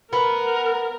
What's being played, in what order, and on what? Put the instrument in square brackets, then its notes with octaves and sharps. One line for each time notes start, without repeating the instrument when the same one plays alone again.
[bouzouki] B3 [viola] A#4